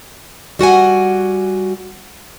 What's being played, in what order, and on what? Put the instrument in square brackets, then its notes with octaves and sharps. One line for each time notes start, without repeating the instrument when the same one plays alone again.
[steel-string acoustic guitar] G3 F#4 F#5 G#5